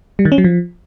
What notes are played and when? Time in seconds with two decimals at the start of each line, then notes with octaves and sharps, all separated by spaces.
0.19 G3
0.25 D#3
0.32 C#4
0.38 F#3
0.44 F3